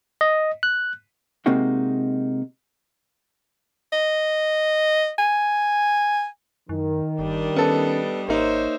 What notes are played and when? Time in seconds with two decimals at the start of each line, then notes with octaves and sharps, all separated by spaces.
0.21 D#5
0.63 F#6
1.46 C3 G#3 A#3 C4 D#4 F#4
3.92 D#5
5.19 G#5
6.69 F#2 D#3
7.19 G1 G3 D4 D#5
7.56 B3 C#4 A4
8.29 G#1 A#3 D#4 C5 C#5 E5